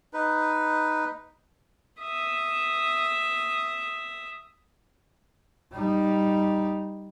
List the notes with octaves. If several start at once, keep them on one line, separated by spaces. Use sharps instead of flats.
D#4 B4
E5 D#6
G3 D#4